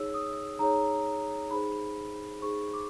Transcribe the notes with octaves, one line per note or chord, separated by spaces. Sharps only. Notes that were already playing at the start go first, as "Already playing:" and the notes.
Already playing: D#4 G#4 C#5 E6
D#6
D#4 G#4 C#5 A#5
D#4 G#4 C5 B5
D#4 G#4 C5 C#6
D6